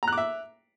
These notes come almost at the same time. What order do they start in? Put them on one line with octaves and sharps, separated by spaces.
A#5 F#6 D6 E5